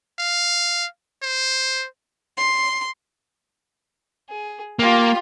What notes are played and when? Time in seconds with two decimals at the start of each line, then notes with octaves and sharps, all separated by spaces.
0.19 F5
1.23 C5
2.37 C6
4.29 G#4
4.79 A#3 F4 G4